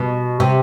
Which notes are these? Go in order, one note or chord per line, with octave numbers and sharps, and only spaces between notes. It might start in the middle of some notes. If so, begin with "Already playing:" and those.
Already playing: B2
C3